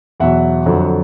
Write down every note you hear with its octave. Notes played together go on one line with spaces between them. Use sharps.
E2 B2 F#3 E5 F#5
F2 D3 F#3